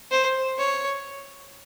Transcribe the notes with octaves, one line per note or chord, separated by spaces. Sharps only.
C5
C#5